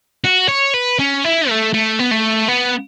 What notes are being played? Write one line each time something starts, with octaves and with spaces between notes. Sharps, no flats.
F#4
C#5
B4
C#4
E4
A3
A3
B3
A3
B3